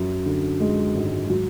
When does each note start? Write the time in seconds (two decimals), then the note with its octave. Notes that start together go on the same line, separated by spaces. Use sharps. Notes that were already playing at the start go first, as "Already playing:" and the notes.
Already playing: F#2
0.26 D3
0.60 G#3
0.95 G#1
1.30 F#3